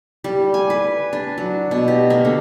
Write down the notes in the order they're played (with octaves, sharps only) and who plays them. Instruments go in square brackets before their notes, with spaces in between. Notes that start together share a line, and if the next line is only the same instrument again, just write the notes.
[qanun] G3
G#5
B4
D4
F#3
B2
G4
A#3
D3